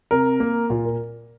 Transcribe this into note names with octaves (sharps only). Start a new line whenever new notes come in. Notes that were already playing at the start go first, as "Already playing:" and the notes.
C3 A#4
A#3
A#2 F4
A#4